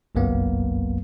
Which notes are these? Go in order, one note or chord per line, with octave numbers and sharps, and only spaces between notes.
G1 C2 F#2 F#3 A#3 B3